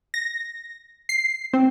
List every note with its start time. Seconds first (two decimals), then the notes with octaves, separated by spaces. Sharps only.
0.14 A#6
1.09 C7
1.53 C4